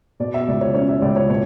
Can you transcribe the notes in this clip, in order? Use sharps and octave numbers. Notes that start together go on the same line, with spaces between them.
B2 D5
E5
C#2 D5
C#5
C#4 C#5
E5
C#2 D5
C#5
B2 C#5